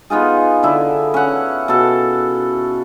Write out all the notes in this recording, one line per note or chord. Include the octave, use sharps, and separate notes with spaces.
B3 D#4 F4 G#4
D3 E4
C#4 F#5
B2 A4